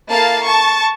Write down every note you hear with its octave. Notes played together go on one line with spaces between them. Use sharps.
A#3 E4 A4 F5 A5
A5 C#6